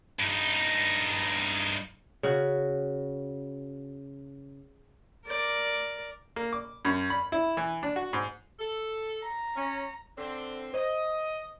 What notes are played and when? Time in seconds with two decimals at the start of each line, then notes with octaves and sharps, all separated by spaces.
0.19 G2 D#4
2.23 C#3 F#4
5.27 A#4 D5
6.36 A#3
6.53 D6
6.85 F#2
7.10 B5
7.32 E4
7.57 E3
7.83 D4
7.96 F#4
8.13 G#2
8.59 A4
9.23 A#5
9.55 C#4
10.17 D3 C4
10.74 C5 D#5